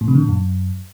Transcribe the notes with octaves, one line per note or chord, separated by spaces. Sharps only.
A2
C3
D3
A#2
F#2